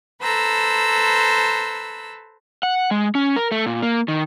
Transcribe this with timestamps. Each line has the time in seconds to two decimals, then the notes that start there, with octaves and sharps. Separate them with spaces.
0.22 A4 B4 C5 A#5 E6
2.63 F#5
2.91 G#3
3.15 C#4
3.36 A#4
3.52 A3
3.66 A#2
3.82 A#3
4.08 D#3